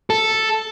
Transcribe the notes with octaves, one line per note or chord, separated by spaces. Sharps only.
A4